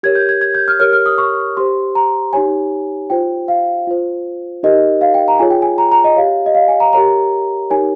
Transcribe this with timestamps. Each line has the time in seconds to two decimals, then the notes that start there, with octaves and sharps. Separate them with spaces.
0.03 G4 A#4 C#5 G#6
0.15 G6
0.29 G#6
0.41 G#6
0.55 G6
0.68 F6
0.80 G4 A#4 C#5 F6
0.93 F6
1.06 D#6
1.18 C#6
1.57 G4 C5 C6
1.95 A#5
2.33 D#4 G4 C#5 G#5
3.10 F4 C5 G5
3.48 F5
3.87 F4 C5
4.63 D#4 G4 A#4 D#5
5.01 F5
5.14 G5
5.28 A#5
5.39 F4 G#4 C#5 G#5
5.50 G5
5.62 G#5
5.78 A#5
5.92 A#5
6.04 D#5
6.16 G4 C#5 F5
6.46 D#5
6.55 F5
6.68 G#5
6.80 A#5
6.93 G4 A#4 C#5 A#5
7.70 D#4 G4 A#4 C#5 G#5